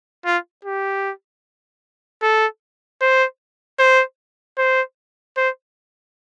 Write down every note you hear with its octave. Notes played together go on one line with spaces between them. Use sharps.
F4
G4
A4
C5
C5
C5
C5